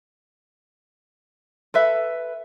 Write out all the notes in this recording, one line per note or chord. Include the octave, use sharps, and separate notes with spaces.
A4 B4 E5